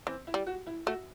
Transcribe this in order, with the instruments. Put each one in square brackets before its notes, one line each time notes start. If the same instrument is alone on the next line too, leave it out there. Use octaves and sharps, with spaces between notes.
[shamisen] E3 [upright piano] C4
[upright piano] E4
[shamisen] G3
[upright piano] F#4
E4
[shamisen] A3 [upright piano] F#4